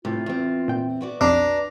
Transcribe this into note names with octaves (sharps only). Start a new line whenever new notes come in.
A2 C3 F4
E2 C4
A#2 G5
B3 F#4 D5
B1 F2 D4 A#5 C7